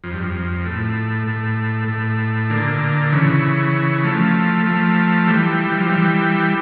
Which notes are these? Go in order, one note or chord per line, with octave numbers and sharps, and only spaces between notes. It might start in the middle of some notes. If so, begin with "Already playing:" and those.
F2
G2
F2
A2
A2
A2
A#2 D3
C#3 E3
F3 A3
F3 A3
E3 G3
E3
F3
E3 G3